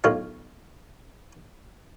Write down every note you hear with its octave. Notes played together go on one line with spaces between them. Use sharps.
B1 A2 F4 C#5 F5